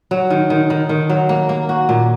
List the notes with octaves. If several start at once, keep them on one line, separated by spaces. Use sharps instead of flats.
F#3
D#3
D#3
D#3
D#3
F#3
A#3
A#3
F#4
A#2